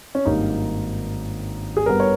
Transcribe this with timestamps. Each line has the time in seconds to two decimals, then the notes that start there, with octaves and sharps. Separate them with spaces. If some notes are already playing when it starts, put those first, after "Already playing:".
0.15 C#4
0.26 G#1 G2 G3 A#3 D#4
1.77 G#4
1.86 G2 G3 B3 A#4
2.00 C#5